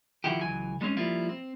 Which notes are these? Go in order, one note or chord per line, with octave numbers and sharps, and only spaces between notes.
D#3 F3 E4 F#4 G4
C#2 E3 F#3 G#5
G3 G#3 C4 C#4 D#4
F3 G3 A#3 E4 F4
C4